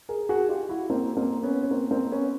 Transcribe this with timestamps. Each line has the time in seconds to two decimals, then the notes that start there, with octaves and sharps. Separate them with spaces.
0.09 G#4 A#4
0.29 F#4 G#4
0.49 F4 G4
0.69 E4 F#4
0.90 A#3 C4
1.17 A#3 C4
1.43 B3 C#4
1.62 C#4
1.71 A#3 C4
1.91 A#3 C4
2.11 B3 C#4